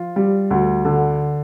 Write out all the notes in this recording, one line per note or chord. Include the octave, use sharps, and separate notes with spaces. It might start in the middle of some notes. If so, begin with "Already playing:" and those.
Already playing: F3 F4
G3
D2
D3